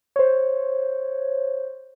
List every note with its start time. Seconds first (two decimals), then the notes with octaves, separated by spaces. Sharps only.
0.16 C5 C#5